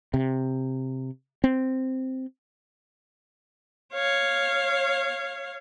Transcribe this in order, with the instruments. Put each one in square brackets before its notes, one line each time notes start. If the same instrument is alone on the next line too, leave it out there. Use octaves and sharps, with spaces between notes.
[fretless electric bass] C3
C4
[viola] C#5 F5